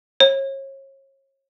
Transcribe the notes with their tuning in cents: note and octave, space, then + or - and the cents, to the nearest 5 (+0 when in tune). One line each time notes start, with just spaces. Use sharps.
C#5 -35